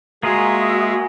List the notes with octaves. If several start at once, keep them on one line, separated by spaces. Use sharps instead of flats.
G#3 A#3 F4 F#4 G#4 E5 D#6 E6